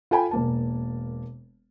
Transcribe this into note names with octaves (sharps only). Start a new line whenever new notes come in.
F4 A4 G5 G#5 B5
E1 A#3 A5